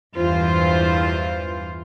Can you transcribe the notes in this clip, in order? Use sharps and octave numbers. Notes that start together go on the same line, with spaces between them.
E2 G2 E3 F4 C5